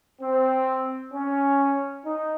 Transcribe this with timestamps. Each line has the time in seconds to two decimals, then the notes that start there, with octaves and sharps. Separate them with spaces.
0.22 C4
1.13 C#4
2.04 D#4